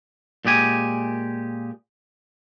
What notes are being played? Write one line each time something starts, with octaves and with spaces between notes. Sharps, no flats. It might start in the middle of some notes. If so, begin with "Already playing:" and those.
A#2 G#3 G4 G#5